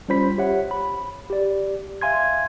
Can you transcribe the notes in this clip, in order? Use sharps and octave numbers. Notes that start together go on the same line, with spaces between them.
G3 C#4 F4 C5 B5 B6
G4 C#5 E5 F#5
B5
G4 D5
E5 F5 G#5 C6 G#6